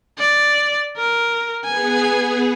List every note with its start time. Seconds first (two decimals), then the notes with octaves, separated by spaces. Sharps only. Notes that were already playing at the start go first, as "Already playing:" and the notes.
0.18 D5
0.97 A#4
1.64 B3 G#4 G#5